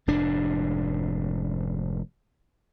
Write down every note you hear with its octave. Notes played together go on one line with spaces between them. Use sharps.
F1 G#2 D4